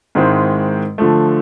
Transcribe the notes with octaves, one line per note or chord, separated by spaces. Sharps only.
G#2 D#3 G#3 C4 E4
D3 F3 A3